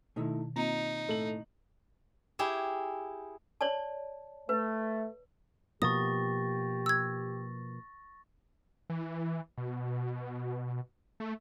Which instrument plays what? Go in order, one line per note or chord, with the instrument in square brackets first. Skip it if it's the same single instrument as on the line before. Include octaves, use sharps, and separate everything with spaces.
[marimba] B2 D#3 [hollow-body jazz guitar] A3 D#4 E4
[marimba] A#3 C4 F4 [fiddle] D#4 [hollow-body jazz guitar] A#5
[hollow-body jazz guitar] A2 [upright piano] A3 F#7
[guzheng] E4 G4 G#4
[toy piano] C#5 D5 A5
[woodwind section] A3 [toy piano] B4
[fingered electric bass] B2 F3 A#3 [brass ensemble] G4 [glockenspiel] C#6 A6 A#6 [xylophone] D#6
[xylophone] E6 G#6
[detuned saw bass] E3
B2
A3